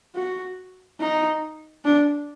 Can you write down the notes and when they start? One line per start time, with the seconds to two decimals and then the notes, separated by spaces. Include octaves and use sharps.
0.15 F#4
1.00 D#4
1.85 D4